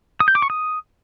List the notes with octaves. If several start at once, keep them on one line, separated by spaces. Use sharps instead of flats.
D#6
G6
D6
C#6
D#6